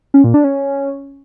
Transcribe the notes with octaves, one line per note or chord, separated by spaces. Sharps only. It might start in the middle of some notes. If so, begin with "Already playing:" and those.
C#4
A#2
D4
C#4